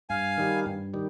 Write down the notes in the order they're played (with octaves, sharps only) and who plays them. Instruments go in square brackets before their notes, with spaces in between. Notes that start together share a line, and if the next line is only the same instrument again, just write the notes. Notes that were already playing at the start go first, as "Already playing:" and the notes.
[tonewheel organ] G2 [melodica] F5 G#5
[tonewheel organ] D#3 G3
G2
D#3 G3